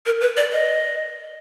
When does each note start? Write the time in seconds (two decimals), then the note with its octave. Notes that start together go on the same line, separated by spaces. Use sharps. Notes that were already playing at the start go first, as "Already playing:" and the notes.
0.06 A#4
0.21 B4
0.37 D5
0.52 D#5